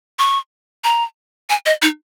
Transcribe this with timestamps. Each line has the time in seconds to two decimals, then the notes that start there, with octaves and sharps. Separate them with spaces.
0.19 C#6
0.84 A#5
1.50 G#5
1.66 D#5
1.82 D#4